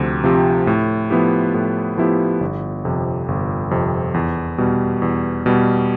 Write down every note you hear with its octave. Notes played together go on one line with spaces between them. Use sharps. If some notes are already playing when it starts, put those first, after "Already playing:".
Already playing: D2 C3 F3 C4 G4
C3 F3 C4 G4
A2
F3 B3 E4 G4
A2
F3 B3 E4 G4
G1
F2 C3
G1
F2 C3
E2
B2 G3
E2
B2 G3